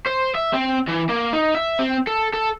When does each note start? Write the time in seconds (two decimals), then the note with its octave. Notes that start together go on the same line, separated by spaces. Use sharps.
0.07 C5
0.35 E5
0.53 C4
0.88 E3
1.09 A#3
1.33 D#4
1.55 E5
1.79 C4
2.07 A4
2.34 A4